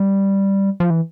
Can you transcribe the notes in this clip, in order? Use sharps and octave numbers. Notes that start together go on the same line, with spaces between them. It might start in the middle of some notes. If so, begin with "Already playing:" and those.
Already playing: G3
F3
E3